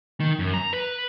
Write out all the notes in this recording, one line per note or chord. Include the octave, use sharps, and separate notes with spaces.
D#3
F#2
A#5
B4